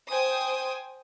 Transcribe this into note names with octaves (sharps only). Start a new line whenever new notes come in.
C5 G5 G#5 D#6